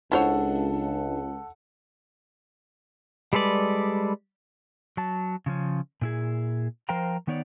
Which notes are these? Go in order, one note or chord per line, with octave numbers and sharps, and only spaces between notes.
C#2 D4 E4 A4 C5 C#5 F#5
G3 G#3 A4 B4 D5
F#3 A5
C#3 F3 C#4
A#2 E4 G#4
F3 A#4 C5 F5 G5 A#5
D#3 B3 D#4 C#5 D5